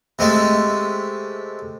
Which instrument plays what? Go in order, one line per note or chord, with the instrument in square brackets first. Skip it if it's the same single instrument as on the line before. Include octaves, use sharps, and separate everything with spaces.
[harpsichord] C3 G#3 A3